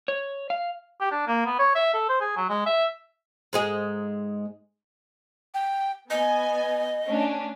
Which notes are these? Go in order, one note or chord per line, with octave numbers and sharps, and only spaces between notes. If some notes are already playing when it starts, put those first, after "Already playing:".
C#5
F5
G4
D4
A#3
B3
C#5
E5
A4
C5
G#4
F#3
G#3
E5
G#2 G#3 G#4
G5
B3 D#5 G#5
A3 C#4 D4